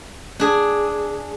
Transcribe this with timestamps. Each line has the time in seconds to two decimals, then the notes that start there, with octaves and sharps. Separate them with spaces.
0.40 D4 G#4